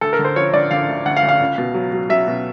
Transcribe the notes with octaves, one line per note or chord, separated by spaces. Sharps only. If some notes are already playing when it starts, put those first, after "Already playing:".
D2 A4
A#4
D3
C5
F3 C#5
D3 D5
D3 F5
D2
D2 F#5
F5
D2
F5
C#2
B2
F#3
F#3
F#3 E5
B2